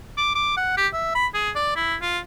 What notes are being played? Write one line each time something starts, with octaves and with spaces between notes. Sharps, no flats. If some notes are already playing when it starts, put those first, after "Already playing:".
D6
D6
F#5
G4
E5
B5
G#4
D5
E4
F4